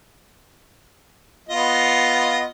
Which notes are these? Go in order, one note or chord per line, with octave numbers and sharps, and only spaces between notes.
B3 F4 D#5